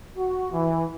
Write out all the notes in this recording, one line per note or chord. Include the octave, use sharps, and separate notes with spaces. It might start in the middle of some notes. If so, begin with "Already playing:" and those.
F#4
E3